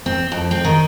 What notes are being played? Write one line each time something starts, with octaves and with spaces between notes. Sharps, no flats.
C4
F2
C4
D#3